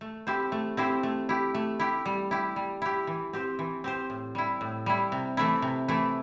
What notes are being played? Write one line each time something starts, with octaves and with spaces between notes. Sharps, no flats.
A3
C4 E4 G4 C5
A3
C4 E4 G4 C5
A3
E4 G4
A3
E4 G4
G3
E4 G4
G3
E4 G4
E3
C4 G4 C5
E3
C4 G4 C5
A2
G3 E4
A2
G3 E4
C3
E3 A3 E4
C3
E3 A3 E4